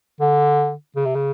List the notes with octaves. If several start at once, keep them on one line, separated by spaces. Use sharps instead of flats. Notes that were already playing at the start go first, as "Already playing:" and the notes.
D3
C#3
C3
C#3